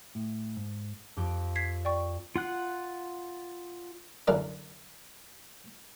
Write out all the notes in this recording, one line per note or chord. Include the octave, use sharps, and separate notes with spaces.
A2
G#2
F2 G4 D7
G#6 B6 C7
D5 G5 C#6
F4 F#5 F#6
C2 F#2 D3 D4 A#4 D5